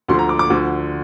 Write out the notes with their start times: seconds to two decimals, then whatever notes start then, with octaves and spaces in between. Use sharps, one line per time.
0.08 D2 D3 F3 C6
0.19 A#5
0.29 D6
0.39 D6
0.50 D2 D3 F3